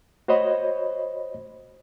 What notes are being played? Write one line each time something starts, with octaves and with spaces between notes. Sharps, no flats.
F#4 C5 C#5 D#5 B5